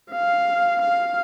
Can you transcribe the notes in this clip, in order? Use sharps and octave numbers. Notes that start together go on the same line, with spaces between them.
F5
F5